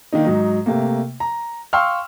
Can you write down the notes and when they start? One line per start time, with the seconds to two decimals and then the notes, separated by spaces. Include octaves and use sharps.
0.12 D#3 A#3 D4 D#4
0.25 G#2 F#3 D#4
0.66 C3 A3 A#3
1.20 A#5
1.73 F5 G5 C6 C#6 E6 F6